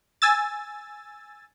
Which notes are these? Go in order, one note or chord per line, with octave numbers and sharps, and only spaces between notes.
G#5 E6 A6